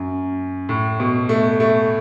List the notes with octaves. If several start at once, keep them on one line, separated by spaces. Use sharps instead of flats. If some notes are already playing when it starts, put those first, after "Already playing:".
Already playing: F#2
A2
B2
A3
A3